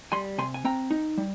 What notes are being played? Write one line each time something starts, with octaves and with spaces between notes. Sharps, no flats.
G3 G#5 C6
C3 G#5 C6
G#5
C4 G5 A#5
D#4
G3